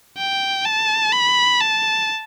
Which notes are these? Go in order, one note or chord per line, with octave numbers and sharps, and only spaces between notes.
G5
A5
B5
A5